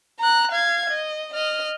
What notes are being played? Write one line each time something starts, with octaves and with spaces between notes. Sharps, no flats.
A#5 F#6
F5 G#6
D#5
D#5 F6